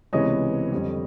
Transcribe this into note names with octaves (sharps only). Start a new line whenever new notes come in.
C#2 C3 E3 G#3 B3 C#5 D#5
F2 D3 G3